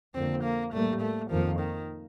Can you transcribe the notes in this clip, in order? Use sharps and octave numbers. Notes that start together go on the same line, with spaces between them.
F2 D3 F3 A#3 C4
A#3
A2 G3 A3 A#3
A3
F2 D#3 F3 A#3
D#3